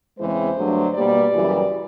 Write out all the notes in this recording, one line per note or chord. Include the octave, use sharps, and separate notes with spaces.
E2 C#3 E3 G#3 C4 C5
G2 D3 F#3 A3 D4
B2 G3 A#3 D5
F#2 C#3 E3 G3